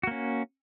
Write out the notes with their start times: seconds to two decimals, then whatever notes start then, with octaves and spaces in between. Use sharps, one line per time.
0.03 F#4
0.07 A#3
0.11 C#4